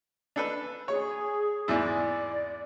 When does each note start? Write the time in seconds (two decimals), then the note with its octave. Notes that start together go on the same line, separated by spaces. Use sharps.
0.36 D4 A4 B4
0.88 G#4 C#5
1.68 E2 G#2 E4 D5